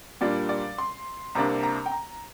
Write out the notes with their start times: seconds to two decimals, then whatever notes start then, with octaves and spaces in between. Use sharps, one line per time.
0.21 A#2 G3 A#3 D4 D5
0.49 D5
0.78 C6
1.35 C2 C3 A#3 D4 A#5
1.63 A#5
1.86 G5
1.92 A#5